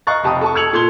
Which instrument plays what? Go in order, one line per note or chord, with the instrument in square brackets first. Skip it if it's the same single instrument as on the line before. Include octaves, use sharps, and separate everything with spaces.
[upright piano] D#5 F5 A#5 C#6 F#6 A6
F1 G4 A5 B5 D#6
A4 A5 C#6
E6 G#6 C#7 F7 F#7
A#2 A4 C6 G#6 G7